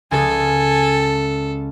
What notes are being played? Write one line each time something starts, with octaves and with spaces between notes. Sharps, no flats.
C#2 G#4 A4 G#5